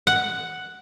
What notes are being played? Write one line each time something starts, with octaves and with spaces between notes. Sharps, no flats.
F#5